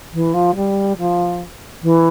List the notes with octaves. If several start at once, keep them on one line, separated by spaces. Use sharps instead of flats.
E3
F3
G3
F3
E3